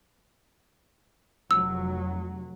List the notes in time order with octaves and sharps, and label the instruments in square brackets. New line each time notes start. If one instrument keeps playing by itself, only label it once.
[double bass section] F1 F#3 [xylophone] E6